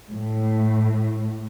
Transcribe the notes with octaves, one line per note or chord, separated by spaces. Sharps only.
A2